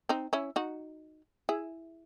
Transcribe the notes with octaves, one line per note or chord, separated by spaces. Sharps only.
C4 D#4
C#4 E4
D#4 F#4
E4 G#4